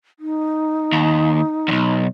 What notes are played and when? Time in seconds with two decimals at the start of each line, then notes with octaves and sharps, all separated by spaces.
0.19 D#4
0.92 D#2
1.68 B1 E2